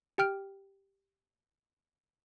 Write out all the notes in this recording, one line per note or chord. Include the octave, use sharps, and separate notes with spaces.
G4 G5 F6 D7